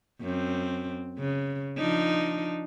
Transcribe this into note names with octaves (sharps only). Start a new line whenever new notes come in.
F#2 C4
C#3
F3 D4 D#4